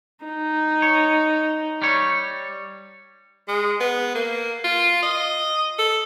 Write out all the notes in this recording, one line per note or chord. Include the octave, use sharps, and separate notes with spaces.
D#4
C#5
G3 C#5
G#3
B3
A#3
F4
D#5
A4